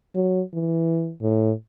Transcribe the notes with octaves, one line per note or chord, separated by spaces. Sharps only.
F#3
E3
A2